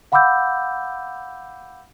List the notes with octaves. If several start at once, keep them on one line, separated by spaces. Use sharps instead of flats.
F5 F#5 B5 D6 E6 G6